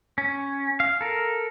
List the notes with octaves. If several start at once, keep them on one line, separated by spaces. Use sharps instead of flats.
C#4
F5
A4 A#4